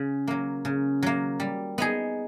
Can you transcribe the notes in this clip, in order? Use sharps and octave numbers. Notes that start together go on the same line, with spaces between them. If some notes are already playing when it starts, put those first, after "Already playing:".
Already playing: C#3
F#3 A#3
C#3
F#3 A#3
G3
B3 D#4 G#4